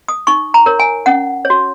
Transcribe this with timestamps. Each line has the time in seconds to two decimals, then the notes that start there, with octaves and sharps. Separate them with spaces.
0.08 D#6
0.27 D#4 C#6
0.54 A#5
0.66 A#4 C#5
0.79 G#5
1.06 C#4 F#5
1.45 C#5
1.50 F#4